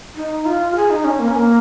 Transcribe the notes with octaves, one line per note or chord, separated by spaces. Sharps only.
D#4
F4
G#4
D#4
C#4
A#3
C#4
A#3